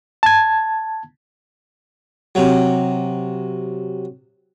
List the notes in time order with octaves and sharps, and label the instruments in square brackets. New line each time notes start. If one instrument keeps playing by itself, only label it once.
[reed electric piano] A5 G#6
[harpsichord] C3 F#3